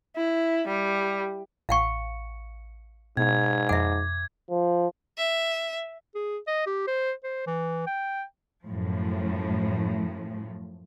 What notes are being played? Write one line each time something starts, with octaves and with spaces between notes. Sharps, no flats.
E4
G3
A1 F5 F#5 C#6 C#7
G#2 B2 G#6
F2 E5 F#5 D6
F3
E5
G#4
D#5
G4
C5
C5
E3
G5
F#2 A2 F3